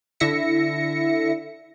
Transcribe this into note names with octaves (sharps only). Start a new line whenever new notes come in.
D3 E4 E5 A#6 C#7